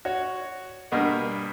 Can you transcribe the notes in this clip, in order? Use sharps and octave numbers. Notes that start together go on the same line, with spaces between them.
F#4 C#5
G2 B2 A#3 F#5